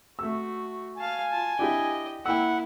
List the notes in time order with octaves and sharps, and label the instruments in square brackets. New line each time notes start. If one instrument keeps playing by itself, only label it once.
[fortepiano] A3 E6 [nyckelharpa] F#4
[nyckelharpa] F5 A5 [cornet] G#5
[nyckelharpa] F4 A5
[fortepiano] D4 E4 G4 [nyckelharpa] D#5 G5
[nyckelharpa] A#3 E4 [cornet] F#5 [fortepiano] G5 E6